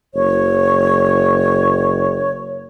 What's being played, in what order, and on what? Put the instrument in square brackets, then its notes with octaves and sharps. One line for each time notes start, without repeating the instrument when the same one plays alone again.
[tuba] F#1 [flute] C#5